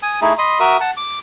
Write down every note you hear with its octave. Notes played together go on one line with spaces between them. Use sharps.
G#5 D#6
A3 D#4 E4 G#4
D#5 B5 C6 D#6
F#4 A#4 E5 D#6
F#5 A5
D6